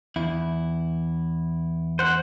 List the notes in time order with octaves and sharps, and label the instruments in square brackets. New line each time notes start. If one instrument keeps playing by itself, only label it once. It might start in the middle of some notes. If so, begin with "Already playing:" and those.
[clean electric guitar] E2 E4
[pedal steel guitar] C5 F#5